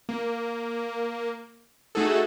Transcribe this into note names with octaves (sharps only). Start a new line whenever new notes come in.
A#3
A3 D#4 F#4 G#4 A4